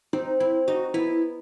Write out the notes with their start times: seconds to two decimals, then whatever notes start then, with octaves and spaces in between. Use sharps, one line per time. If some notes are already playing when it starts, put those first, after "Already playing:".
0.13 C4 D#4
0.40 C4 E4
0.67 D#4 F#4
0.94 B3 E4